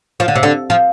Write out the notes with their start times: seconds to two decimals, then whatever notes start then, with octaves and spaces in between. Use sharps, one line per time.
0.20 F3
0.28 D3
0.36 C3
0.43 D3
0.70 F3